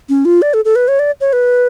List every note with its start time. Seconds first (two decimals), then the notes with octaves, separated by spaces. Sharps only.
0.09 C#4
0.25 F4
0.42 D5
0.54 A4
0.65 A4
0.76 B4
0.88 C#5
0.99 D5
1.21 C#5
1.33 B4